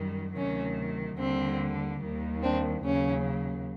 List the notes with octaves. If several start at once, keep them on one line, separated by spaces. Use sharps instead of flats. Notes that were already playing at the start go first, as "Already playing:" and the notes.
Already playing: F#2 D#3 G3
D2 C3 D#3 F#3 C#4
D#2 D3 G3 C4
D#2 D#3 G3
C4 D4
D#2 C#3 F#3 C#4